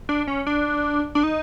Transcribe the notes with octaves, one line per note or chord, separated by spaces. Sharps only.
D4
C#4
D4
D4
D#4